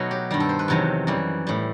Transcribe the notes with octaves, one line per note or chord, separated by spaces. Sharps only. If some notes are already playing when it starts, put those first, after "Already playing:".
Already playing: B2 F#3 A3 B3 D#4
G4
G2 D#3 G3
A4
C5
B4
E2 C3 D#3 F#3
F#2 E3 G3
A2 G3